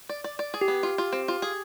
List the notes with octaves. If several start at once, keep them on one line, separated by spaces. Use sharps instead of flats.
D5
D5
D5
G#4
G4
B3
F4
F4
C4
F4
G#4